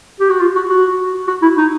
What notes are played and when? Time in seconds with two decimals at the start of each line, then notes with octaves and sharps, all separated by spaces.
0.20 G4
0.30 F#4
0.40 F4
0.55 F#4
0.69 F#4
1.27 F#4
1.42 E4
1.57 D#4